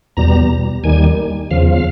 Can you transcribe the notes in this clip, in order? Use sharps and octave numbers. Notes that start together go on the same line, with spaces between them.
E2 B2 G3 A#5
D#2 D#3 G3 G#5
E2 C#3 F3 F5
F5